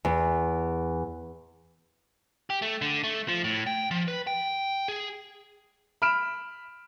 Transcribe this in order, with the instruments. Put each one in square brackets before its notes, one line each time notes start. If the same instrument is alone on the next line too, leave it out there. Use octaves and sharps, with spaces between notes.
[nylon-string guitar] E2
[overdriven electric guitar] G4
A3
D3
A3
F3
A2
G5
F3
B4
G5
G#4
[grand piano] B5 F6 D7 E7